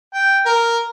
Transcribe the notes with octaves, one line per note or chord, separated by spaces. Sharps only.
G5
A#4